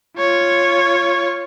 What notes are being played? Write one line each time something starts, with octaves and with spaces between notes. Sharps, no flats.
F4 C#5